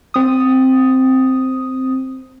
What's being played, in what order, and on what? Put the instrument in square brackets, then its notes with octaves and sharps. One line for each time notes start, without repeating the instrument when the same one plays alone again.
[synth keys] C4 D#6